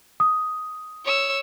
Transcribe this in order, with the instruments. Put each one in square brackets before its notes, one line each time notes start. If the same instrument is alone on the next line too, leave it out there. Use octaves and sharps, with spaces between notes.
[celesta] D#6
[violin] C#5 E6